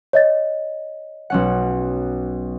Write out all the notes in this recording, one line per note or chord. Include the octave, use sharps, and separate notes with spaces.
C#5 D#5 A6
B1 C#4 F#5